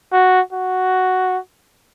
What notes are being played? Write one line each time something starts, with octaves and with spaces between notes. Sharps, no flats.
F#4
F#4